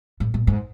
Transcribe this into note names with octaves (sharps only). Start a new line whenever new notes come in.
A2
A#2
G#2